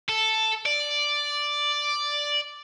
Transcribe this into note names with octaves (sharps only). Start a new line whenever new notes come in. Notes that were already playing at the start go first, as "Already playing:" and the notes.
A4
D5